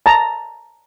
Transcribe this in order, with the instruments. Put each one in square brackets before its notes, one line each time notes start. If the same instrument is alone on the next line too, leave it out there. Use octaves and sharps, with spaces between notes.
[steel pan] A5 A#5